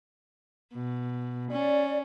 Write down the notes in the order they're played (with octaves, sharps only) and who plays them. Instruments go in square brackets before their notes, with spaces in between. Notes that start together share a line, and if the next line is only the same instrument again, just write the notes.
[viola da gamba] B2
[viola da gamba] C#4 [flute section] D5